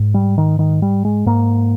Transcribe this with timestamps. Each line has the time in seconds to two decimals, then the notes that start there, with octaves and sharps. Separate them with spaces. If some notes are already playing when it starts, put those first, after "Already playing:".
Already playing: G#2
0.14 G3
0.38 D#3
0.59 D#3
0.82 G3
1.05 G#3
1.26 G#2 A#3